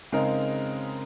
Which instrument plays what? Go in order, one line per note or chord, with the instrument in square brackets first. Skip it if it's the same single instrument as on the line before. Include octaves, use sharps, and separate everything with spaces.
[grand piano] C#3 G#3 C4 D#4 A#4